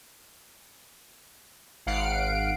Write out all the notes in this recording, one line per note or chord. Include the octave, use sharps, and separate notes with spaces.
G#1 F5 F#5 C7 D7